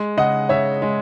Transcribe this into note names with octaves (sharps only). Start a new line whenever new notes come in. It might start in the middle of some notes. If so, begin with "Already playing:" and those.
Already playing: G#3
C#3 D#5 F#5
C#3 C#5 E5
G#3